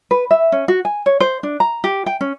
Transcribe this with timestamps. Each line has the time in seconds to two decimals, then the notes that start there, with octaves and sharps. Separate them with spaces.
0.11 B4
0.31 E5
0.52 C#4
0.68 F#4
0.85 G#5
1.06 C#5
1.20 C5
1.43 D4
1.60 A#5
1.84 G4
2.06 G5
2.21 C#4